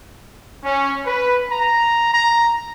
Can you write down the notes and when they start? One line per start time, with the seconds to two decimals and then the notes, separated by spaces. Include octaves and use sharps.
0.64 C#4
1.05 B4
1.51 A#5
2.13 A#5